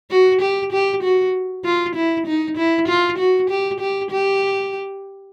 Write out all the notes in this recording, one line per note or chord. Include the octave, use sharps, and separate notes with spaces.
F#4
G4
G4
F#4
F4
E4
D#4
E4
F4
F#4
G4
G4
G4